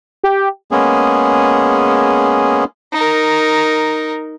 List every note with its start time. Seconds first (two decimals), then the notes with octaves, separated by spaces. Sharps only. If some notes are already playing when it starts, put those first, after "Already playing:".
0.24 G4
0.71 G#3 A#3 B3 C#4 G#4
2.93 D#4 A#4